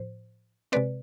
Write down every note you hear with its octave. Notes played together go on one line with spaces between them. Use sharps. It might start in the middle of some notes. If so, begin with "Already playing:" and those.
Already playing: A2 F3 C5
C3 G#3 C4 B4 D5